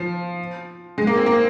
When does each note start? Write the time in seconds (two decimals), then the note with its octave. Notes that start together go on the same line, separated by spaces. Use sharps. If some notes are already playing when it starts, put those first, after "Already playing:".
Already playing: F3
0.98 G#3
1.07 A#3
1.17 C4
1.26 A#3